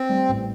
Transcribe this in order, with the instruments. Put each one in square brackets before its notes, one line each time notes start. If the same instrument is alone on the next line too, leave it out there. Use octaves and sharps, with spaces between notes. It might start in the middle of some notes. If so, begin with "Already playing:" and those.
Already playing: [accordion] C4
[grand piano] G3
A1